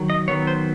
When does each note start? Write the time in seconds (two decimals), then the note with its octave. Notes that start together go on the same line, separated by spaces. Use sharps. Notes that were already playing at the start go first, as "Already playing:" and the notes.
Already playing: D#3 F#3
0.10 D#5
0.28 D#3 F#3 B3 C#5
0.47 C5